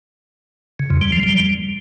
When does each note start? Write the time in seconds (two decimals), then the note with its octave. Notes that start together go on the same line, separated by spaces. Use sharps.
0.79 C#3
0.90 F2
1.01 G3
1.12 F3
1.23 G3